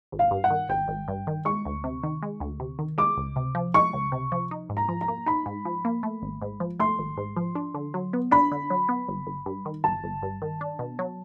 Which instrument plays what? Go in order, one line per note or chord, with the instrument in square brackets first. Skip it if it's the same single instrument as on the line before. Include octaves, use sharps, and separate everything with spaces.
[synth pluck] G#1
[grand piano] F5
[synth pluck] G2
[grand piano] F#5
[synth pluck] D#3
[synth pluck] G#1 [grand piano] G5
[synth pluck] G#1
G2
D#3
[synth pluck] G#3 [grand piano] C#6
[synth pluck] D2
C3
D#3
G#3
D2
C3
D#3
[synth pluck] G#3 [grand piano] D6
[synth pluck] C#2
C3
F3
[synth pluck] G#3 [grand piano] C#6
[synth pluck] C#2
C3
F3
D#4
G#2
[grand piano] A#5
[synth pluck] F3
[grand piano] A#5
[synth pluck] A#3
[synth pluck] D#4 [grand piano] B5
[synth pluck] G#2
F3
A#3
A3
G#1
G#2
F3
[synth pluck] A3 [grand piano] C6
[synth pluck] G#1
G#2
F3
D4
D3
F#3
B3
[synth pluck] D4 [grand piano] B5
[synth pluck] D3
F#3
B3
G1
G1
G2
D#3
[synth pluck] G1 [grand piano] A5
[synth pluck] G1
G2
D#3
D4
B2
F#3